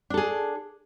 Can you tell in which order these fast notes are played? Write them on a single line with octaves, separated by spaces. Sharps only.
D4 A4 G#4